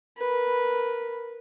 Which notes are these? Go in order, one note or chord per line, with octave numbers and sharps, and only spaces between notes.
A#4 B4